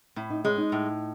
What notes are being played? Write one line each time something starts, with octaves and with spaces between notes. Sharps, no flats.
A2 E4
D#4
G#3 C#4
D#4
A2